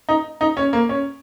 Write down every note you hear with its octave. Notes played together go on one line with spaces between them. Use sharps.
D#4
D#4
C#4
A#3
C#4